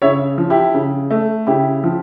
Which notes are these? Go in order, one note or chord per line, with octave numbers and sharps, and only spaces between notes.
C#3 C#5 E5
F3
E4 G4
C#3
A3
C#3 E4 G4
F3